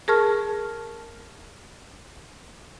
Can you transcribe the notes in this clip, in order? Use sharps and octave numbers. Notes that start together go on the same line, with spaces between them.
G#4 A#4 A5 C#6 F6